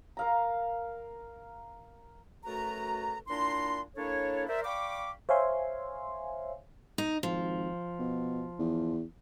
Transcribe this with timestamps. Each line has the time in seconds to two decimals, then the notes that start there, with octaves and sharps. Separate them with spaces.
0.17 A#4 F5 A#5
2.45 F#2 A3 F#4 A4 B4 A#5
3.29 A#2 D4 E4 A#5 C6
3.97 A#3 D4 E4 A4 C#5
4.48 A#4 C5 D5 E5
4.65 D5 F5 G5 B5 C#6 D6
5.29 C5 C#5 E5 F5 G#5 C6
6.98 D#4
7.23 G#1 F3
7.99 B2
8.59 E2